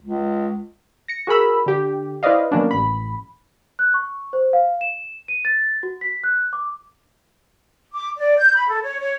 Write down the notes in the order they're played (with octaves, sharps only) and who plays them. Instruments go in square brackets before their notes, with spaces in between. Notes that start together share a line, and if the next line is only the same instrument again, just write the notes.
[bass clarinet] C#2
[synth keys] A#6 C#7
F#4 G#4 A#4 B5 E6
D3 G4
E4 B4 C5 D5 D#5 F5
D#3 F#3 A#3 B3 C#4 D4
A1 B5
[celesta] F#6
C#6
C5
F5
E7
D#7
A6
F#4
B6
F#6
D6
[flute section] D6
D5
G6
B5
A4
C#5
C#5